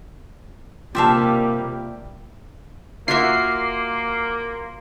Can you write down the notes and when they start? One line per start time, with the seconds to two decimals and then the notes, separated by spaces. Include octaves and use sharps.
0.95 C3 G3 A#3 F4 G4 E5 F5 A5
3.08 A#3 F4 F#4 E5 C6 D6 C7